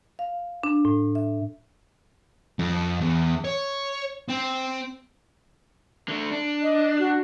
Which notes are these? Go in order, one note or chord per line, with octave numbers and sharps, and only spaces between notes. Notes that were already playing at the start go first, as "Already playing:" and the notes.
F5
D4
A2
E5
F2
E2
C#5
C4
D3 A3
D4
D#5
F#4